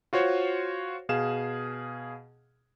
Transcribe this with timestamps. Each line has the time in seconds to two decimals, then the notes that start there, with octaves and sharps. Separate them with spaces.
0.13 F4 F#4 C5 C#5
1.09 B2 G#4 F5 E7